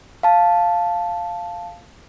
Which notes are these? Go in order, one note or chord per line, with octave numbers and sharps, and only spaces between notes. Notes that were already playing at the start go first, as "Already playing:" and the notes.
F5 A5